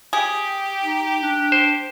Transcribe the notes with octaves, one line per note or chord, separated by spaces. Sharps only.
G4 G#4
D#4
D4
C5